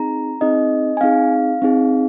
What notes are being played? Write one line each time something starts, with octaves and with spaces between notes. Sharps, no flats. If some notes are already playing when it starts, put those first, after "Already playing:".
Already playing: C4 D#4 G#4 A#5
C4 D#4 G#4 D#5
G#5
C4 D#4 G#4 F5
C4 D#4 G#4